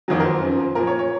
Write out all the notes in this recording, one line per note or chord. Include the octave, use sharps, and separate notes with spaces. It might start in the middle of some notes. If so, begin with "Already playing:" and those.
F2 D#3 F#3
A#4
C5
F#2 F3
A#2 F3 A#4
C#5
C#5